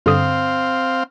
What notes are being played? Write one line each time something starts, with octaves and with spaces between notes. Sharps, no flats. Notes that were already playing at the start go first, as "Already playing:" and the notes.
G2 D3 C4 F5 D#6